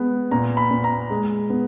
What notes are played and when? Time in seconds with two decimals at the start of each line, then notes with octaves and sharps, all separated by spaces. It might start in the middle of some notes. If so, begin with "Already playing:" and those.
Already playing: G#3 B3
0.31 A#2 A#5
0.57 B5
0.71 A#2
0.84 A#5
1.10 G#3
1.50 B3